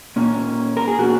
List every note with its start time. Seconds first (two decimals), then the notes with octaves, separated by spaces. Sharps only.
0.16 A#2 A#3 C#4
0.77 A#4
0.88 G#4
0.98 A#2 A#3 C#4 F#4